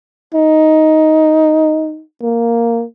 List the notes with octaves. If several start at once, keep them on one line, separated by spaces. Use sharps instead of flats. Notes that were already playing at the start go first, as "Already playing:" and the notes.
D#4
A#3